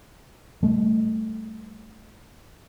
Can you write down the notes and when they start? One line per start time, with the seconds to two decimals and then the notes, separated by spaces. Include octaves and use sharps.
0.63 G3 A3